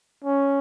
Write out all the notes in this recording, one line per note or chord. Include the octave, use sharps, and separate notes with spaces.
C#4